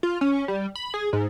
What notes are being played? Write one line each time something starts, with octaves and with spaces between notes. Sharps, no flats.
F4
C#4
G3
B5
G#4
G#2